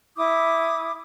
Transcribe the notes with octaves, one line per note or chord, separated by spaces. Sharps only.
E4 D6 D#6